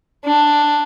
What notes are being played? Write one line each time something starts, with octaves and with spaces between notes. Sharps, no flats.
D4